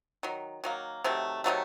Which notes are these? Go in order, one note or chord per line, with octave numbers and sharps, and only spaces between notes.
D#3 F#3
D#3 F#3 A#3
C3 D#3 F#3 A3
C3 D#3 F#3 A3